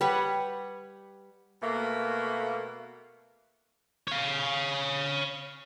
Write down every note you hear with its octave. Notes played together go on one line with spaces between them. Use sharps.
G3 B4 C#5 F#5
B2 A3 A#3
C#5 F5